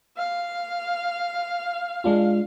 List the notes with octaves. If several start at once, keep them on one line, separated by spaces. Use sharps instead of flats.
F5
G#3 D4 F4